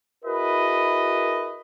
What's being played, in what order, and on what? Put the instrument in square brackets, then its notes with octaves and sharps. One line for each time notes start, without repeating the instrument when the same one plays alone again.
[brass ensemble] E4 F#4 G#4 A#4 B4 D#5